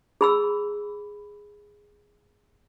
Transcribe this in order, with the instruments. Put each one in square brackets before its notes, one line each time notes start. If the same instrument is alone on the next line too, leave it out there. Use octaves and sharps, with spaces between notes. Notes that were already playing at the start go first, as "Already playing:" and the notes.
[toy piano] G#4 B5 E6